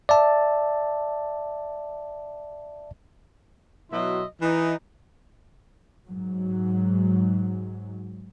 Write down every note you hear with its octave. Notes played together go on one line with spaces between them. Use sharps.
D5 E5 A5
B2 F#3 E4 D#5 E5 C6
E3 D#4
G#2 F#3